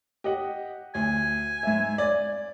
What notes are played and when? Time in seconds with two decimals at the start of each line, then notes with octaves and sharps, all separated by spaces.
0.24 G4 D#5 F#5
0.95 D2 G#5
1.63 G#2 E5
1.98 D5